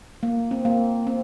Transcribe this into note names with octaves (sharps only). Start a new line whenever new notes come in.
A#3
C4
A#3
C4